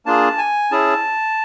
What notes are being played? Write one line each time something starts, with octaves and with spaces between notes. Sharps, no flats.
A#3 D4 F4 G#4 A5
G#5
C#4 E4 G#4 A5